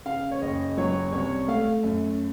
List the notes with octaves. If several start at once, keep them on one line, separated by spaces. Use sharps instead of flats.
C#3 F5
C#5
F#1 D#5
F#3 C#5
C2 C#5
A3 F5
F#2